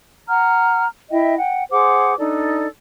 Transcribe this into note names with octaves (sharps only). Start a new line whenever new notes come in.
F#5 A#5 F6
E4 D#5 E5 G5
F#5 G5
G#4 C5 F#5 D6
D4 D#4 A4 D5